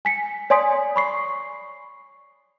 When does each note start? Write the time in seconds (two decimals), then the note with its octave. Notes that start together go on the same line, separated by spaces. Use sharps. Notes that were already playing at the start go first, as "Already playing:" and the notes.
0.05 G#5 B6 C#7
0.50 C#5 D5 G#5 C6 D#6 B6
0.96 B5 C#6 C7